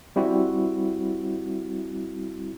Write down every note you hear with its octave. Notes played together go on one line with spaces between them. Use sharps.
G3 C4 E4 F#4